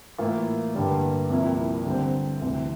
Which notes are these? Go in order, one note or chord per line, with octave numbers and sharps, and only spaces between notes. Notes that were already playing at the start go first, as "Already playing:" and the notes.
A2 E3 A#3 F4
G2 D3 G3 A#3
C2 C3 F3 A#3 E4
D3 G3 C4
D2 C3 E3